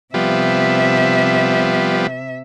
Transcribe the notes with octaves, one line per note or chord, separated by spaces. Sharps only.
C3 F3 G3 B3 E5